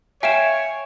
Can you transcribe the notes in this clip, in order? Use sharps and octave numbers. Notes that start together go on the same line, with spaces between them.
C#5 E5 F5 G5 G#5 E7